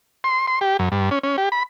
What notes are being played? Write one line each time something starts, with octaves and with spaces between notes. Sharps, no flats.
C6
C6
G4
F#2
G2
C#4
C#4
G4
B5